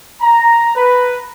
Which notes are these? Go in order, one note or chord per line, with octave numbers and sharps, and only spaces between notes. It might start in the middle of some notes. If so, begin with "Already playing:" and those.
A#5
B4